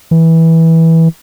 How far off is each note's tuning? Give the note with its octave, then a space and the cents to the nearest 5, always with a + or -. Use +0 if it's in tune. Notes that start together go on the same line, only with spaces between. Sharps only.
E3 -15